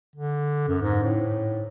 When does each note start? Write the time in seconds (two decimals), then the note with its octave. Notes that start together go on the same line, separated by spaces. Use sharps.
0.16 D3
0.68 F#2
0.82 G#2
1.03 A2